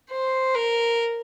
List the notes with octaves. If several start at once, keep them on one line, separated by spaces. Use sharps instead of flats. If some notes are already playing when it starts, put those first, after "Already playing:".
C5
A#4